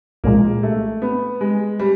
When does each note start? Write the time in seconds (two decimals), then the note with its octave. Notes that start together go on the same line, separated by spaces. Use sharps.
0.24 C2 A#2 F3 G#3 A#3
0.63 A3
1.02 B3
1.41 G#3
1.79 G3